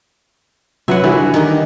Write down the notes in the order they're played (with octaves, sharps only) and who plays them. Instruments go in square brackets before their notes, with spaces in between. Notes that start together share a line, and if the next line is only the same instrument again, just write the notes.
[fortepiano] F#2 F#3 B4 [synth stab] C3 [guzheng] E5 F#5
[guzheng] D3 [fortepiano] E3 F#4 [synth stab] F#3 G3 E4
[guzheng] D#3 D#4 G4